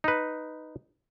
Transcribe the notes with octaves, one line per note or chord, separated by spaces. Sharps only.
D#4 B4